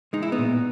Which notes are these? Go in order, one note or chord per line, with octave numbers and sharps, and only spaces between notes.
G#3 D#4
E4
B3 D#4
A#2